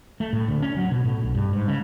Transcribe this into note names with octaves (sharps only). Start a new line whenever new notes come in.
A3
A2
D2
C#4
F#3
B2
A2
B1
G2
G#2
C#3